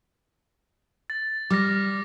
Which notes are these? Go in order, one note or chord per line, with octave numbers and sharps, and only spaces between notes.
A6
G3 D6 F6 A#6